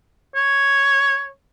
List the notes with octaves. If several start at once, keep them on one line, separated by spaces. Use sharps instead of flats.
C#5